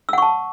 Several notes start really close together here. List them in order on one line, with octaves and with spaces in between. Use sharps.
E6 F#5 C#6 A5